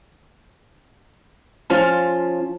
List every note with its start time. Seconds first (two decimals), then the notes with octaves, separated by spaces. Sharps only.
1.70 F3 C#4 F4 A5